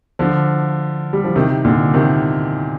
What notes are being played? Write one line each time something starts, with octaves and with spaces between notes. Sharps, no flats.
D3 F3
G3
F3
C3 D#3
A#2 D3
C3 D#3